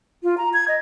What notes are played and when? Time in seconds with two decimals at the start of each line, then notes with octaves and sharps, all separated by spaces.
0.23 F4
0.38 A#5
0.53 G#6
0.68 D#5